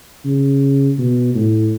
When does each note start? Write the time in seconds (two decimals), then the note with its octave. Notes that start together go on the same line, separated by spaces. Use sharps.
0.25 C#3
0.98 B2
1.35 A2